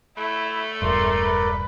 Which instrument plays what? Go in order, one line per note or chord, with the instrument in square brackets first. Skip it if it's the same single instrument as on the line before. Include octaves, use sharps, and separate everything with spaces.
[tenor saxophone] A3 [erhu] E4
[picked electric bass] E1 G2 [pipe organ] A#4 D5 [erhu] C6
[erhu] B4